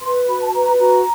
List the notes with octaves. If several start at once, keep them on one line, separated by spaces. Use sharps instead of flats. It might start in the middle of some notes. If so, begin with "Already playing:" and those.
B4 C6
F#4 B5
A5
B4 A#5
F#4 A#5